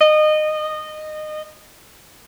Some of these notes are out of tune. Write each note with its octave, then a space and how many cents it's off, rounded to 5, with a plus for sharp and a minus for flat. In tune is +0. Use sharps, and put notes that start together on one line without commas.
D#5 -20